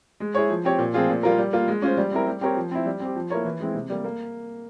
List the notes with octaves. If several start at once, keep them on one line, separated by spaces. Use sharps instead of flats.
G#3
E4 G#4 C#5
F3
C4 G4 C#5
A#2
F3 C4 F4 G#4
A#2
G3 A#3 F4 A#4
G3
A#3 F4
G#3
C#4 F4 C5
G3
C4 E4 A#4
G3
C4 G4 A#4 C#5
F3
C4 E4
G3
C4 G4
F3
A#3 E4 A#4 C#5
E3
G#3 C4 E4
C3
G3 A#3
A#3